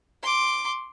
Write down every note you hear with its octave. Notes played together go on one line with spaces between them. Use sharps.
C6 D6